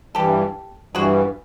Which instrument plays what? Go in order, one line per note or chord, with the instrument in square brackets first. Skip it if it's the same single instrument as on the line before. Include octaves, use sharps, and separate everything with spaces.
[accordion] G2 E3 G3 [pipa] G4 A4
[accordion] G2 E3 G3 [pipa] F#4 G#4